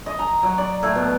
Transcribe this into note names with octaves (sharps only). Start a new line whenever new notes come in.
D#5
A#5
F#3
D5
A2
B2